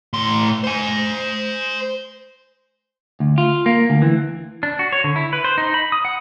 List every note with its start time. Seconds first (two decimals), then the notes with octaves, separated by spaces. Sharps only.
0.13 A2 C6
0.64 C5 G#5
3.20 D2
3.38 F4
3.66 A#3
3.90 D2
4.02 E3
4.63 D4
4.79 F#4
4.92 C#5
5.04 D3
5.16 E4
5.33 B4
5.44 C5
5.58 D#4
5.74 B5
5.92 D#6
6.05 F#5